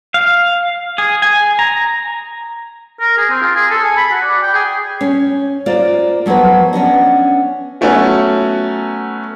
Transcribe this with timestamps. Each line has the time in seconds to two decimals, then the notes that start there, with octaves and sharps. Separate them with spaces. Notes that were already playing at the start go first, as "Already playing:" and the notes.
0.14 F5
0.98 G#4
1.22 G#5
1.59 A#5
3.00 A#4
3.18 G#4
3.30 C4
3.42 F4
3.55 G#4
3.70 A4
3.85 G#5
3.97 B5
4.12 F#4
4.24 D5
4.42 G5
4.54 G#4
5.01 C#4
5.66 A#3 F4 C5 D5
6.26 F3 F#3 A#3 B3 B4
6.73 B3 C#4 D4 D#5
7.81 F#3 A3 B3 C#4